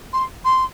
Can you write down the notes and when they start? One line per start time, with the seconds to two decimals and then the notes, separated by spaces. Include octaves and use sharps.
0.13 C6
0.44 C6